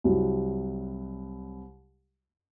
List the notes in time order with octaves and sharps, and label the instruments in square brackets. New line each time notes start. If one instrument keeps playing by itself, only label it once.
[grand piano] C2 F#3 G3